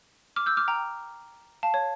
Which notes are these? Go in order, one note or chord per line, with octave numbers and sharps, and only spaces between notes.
D6 F6
E6 G6
D6 F6
G5 A#5
F5 A5
C#5